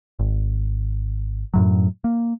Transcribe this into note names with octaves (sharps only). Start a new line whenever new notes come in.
G#1
F#2 A2 F#3
A#3